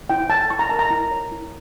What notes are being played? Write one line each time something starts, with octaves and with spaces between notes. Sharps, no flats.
E4 G5
C#5 A5
E4 C#6
A#5
A#4 A5
A#5
E4
C#5
E4